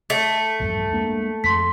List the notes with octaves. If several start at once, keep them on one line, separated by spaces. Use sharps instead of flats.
A3
A#1 E2 G2
G#3 A#3 D4
F2 C6 B6